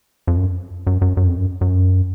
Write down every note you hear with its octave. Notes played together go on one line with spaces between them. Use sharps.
F2
F#2
F#2
F#2
F#2
F2
F#2
F#2